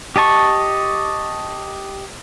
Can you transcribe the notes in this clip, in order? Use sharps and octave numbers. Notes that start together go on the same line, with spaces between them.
G4 D#5 A5 C#6